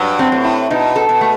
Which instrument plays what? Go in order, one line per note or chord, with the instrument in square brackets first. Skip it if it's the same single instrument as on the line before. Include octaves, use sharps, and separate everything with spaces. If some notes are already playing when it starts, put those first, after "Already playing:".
Already playing: [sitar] G2 [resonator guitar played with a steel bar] F#3
[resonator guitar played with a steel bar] C4
[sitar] A2
[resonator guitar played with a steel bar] E4
[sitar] B2 [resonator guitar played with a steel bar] D#4
[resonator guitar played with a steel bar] A4
[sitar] B2
[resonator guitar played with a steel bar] A3